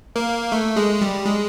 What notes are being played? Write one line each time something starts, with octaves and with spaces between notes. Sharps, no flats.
A#3
A3
G#3
G3
G#3